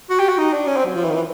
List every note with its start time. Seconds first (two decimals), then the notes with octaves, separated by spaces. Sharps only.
0.10 F#4
0.19 G4
0.29 F#4
0.38 D#4
0.53 D4
0.67 C#4
0.76 C4
0.86 F#3
0.95 F3
1.04 E3
1.09 D#3
1.15 E3